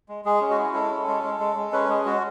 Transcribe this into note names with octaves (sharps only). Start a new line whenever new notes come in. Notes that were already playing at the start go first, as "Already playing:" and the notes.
G#3
G#3 G#4
C#4
F#4
E4
G#3 A4
C#4
G#3
G#3
G#3
G#3
C#4 B4
G#3 G#4
G#3 F#4